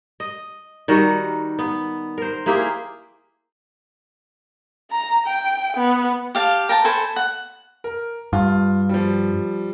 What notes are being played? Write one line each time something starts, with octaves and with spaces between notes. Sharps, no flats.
D#5
D#3 G3 F#4 A#4
B3
A#4 C5
A#3 E4 G4 G#4
A#5
G5
B3
G4 F5 A5
A#4 G5 A5
A4 C5 G#5 B5
F#5
A#4
G2 F4
F3 G3